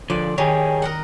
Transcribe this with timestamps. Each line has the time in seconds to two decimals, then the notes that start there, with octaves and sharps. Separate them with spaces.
0.10 D3 F3 D5
0.38 D#3 G4 G#4 C#5
0.82 A#4 D#5 F#5